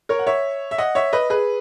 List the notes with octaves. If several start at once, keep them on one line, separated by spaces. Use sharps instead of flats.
A#4 C#5
F#5
C#5 E5
E5
D#5 F#5
C#5 E5
B4 D#5
G#4 B4